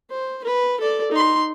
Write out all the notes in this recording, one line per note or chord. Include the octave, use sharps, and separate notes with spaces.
C5
B4
A4 D5
D#4 C6